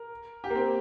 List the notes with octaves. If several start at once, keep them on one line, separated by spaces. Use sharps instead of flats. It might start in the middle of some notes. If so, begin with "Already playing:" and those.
Already playing: A#4
G4
A#3
C4